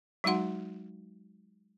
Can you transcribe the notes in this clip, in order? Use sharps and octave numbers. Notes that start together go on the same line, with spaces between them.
F#3 G#3 D#4 F#4 F#5 C6